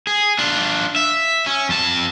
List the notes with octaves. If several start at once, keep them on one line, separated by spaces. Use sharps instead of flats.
G#4
D4 F4
E5
C#4
F2 A5